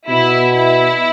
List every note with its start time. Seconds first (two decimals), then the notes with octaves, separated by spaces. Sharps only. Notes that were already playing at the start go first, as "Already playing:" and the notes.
0.09 B2 E4
0.55 E4